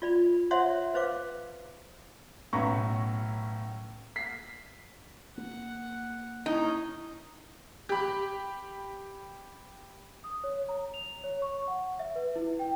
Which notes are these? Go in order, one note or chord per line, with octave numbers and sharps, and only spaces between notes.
F4 D5 B5
C5 C#5 E5 F#5 A#5 C6
B4 C5 F5 D6
B1 A2 B3 C#4 A#5 C#6
B6 C7
A#3 F#5
C#4 D#4 E4 D#5
G4 B5
D#6
C#5
A#5
F7
C#5
C#6
F#5
E5
B4
E4
G5